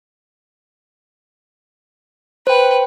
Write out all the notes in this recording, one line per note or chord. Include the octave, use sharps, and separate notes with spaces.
B4 C5 G5